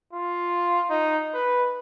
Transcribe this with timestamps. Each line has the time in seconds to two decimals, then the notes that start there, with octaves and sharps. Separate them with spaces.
0.13 F4
0.90 D#4
1.34 B4